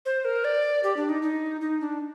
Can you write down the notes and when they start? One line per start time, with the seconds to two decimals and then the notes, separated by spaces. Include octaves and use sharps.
0.06 C5
0.25 A#4
0.44 D5
0.83 G4
0.97 D4
1.09 D#4
1.22 D#4
1.61 D#4
1.81 D4